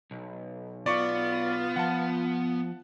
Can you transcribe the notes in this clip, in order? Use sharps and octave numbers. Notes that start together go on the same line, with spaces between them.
B1
B3 F4 D5 C#6
F3 F#5 A5